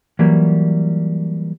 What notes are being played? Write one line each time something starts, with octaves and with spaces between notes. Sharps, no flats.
E3 F#3 G3 A#3